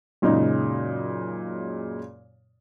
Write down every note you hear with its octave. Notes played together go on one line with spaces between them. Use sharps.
F#2 A#2 C#3 G#3 D#4